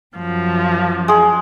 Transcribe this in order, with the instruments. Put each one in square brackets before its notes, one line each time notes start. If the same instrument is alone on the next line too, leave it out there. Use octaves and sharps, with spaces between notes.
[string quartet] F#2 F3
[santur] G#3 G#4